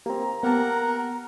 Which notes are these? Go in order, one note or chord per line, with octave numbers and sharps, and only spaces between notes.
A#3 C4 G4 A#5
A#3 B3 G4 A#4 F#5 A5